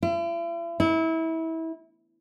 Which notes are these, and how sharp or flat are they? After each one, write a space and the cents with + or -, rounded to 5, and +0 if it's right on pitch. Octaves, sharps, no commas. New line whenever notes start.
E4 +45
E4 -25